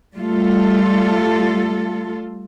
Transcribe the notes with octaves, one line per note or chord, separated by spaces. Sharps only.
G3 A3 F4 A4